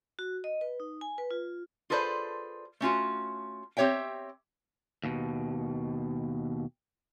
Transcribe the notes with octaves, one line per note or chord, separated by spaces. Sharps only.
F#4
D#5
B4
D#4
G#5
B4
F4
F4 G#4 A4 B4 C5 D5
A3 C#4 F4 F#4
C4 G4 C#5 E5 G5
D#2 B2